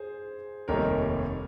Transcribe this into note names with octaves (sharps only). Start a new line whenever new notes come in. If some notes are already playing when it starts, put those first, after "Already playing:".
Already playing: G#4 C5
F1 D#2 D#3 G3 A#4 C#5